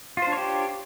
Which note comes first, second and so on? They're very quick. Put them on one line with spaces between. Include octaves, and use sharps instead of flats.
F4 C5 D4 C#5 G4